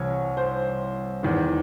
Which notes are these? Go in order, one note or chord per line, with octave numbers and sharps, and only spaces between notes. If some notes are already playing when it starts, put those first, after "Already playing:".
Already playing: C2 C3 E3 C#5
C5
E2 D#3